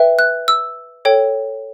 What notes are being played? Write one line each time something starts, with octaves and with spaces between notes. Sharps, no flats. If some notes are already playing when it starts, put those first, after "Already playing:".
Already playing: B4 E5 G5
F#6
E6
A4 C#5 G5